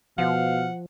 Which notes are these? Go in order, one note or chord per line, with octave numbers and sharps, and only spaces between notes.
B2 F3 F5 F#5